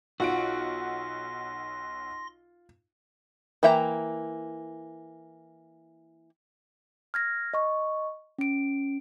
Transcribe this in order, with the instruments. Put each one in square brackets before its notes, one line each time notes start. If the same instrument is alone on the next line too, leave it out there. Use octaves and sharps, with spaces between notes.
[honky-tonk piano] B1 F#5 D7 [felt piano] F4 [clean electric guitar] F#4 [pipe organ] C6 A#6
[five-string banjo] E3 A#3 E5 G5 A#5
[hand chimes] F6 G#6 A#6
D#5 C#6
C#4 D7